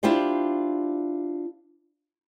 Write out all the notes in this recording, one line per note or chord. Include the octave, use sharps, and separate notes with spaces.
D4 E4 F4 G4 C5 D5